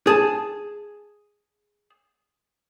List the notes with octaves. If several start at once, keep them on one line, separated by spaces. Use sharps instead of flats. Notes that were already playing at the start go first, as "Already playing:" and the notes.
G#4 A5